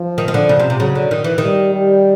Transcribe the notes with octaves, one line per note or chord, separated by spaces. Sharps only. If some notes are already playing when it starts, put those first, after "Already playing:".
Already playing: F3
D#3
D#3
D3
C#3
C3
C3
C#3 F#3
D3
D#3
E3
D#3 G3
G3